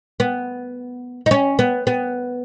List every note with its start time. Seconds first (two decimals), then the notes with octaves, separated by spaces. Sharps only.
0.20 B3
1.26 D#4
1.31 C#4
1.59 B3
1.87 B3